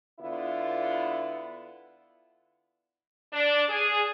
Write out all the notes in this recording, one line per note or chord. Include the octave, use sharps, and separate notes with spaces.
D3 B3 E4 F4
D4
G#4